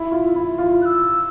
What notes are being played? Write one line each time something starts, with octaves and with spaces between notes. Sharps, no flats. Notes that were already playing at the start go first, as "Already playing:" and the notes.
Already playing: E4
F4
E4
F4
F#6
E6